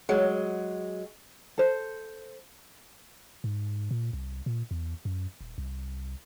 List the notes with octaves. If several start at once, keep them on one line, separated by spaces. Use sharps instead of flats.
F#3 G#3
A4 C5
G#2
A#2
C2
A#2
E2
F#2
D#1
C2